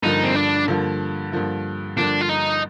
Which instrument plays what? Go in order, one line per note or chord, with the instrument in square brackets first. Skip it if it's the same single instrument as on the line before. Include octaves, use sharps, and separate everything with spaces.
[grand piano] G2 D3 F3 A#3 [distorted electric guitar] D#4
[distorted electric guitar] C4
D4
[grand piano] G2 D3 F3 A#3
G2 D3 F3 A#3
[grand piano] G2 D3 F3 A#3 [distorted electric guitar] D4
[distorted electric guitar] F4
D#4